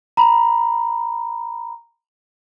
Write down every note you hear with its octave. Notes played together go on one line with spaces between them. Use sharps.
A#5 B5